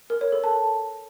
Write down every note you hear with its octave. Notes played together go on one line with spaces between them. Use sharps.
A#4
C#5
A4
A5